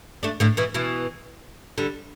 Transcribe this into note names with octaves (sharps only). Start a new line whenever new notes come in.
A3 D4
A2 D3
B2 E3
B2 E3
D3 G3